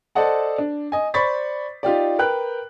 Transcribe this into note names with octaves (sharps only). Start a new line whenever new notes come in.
A4 C5 D5 D#5 F#5 A5
D4
D#5 G#5
C5 D5 B5 C#6 A6 B6
D#4 F4 G4 D5
A#4 B4 G5 F#6